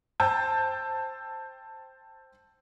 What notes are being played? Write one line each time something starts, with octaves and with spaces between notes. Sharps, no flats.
C5 G5 A5 E6 G6